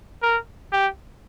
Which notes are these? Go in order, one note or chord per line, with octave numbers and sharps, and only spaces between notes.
A#4
G4